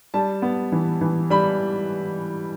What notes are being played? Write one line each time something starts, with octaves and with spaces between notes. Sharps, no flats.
G3 A5
B3
E3
E3
G3 B5